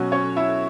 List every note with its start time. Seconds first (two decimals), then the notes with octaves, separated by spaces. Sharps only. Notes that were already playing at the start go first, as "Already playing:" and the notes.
Already playing: B2 F#3 C#4 F#4
0.12 C#4 C#5
0.36 E4 E5